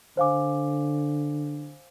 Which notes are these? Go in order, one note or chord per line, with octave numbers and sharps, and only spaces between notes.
D3 C5 F5 G#5 D6